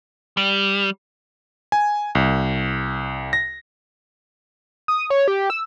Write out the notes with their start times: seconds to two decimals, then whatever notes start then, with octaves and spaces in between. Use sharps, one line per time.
0.37 G3
1.72 G#5
2.15 C2
3.33 A#6
4.88 D#6
5.10 C#5
5.28 G4
5.50 E6